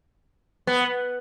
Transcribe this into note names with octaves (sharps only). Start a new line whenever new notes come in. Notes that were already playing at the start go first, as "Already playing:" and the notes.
B3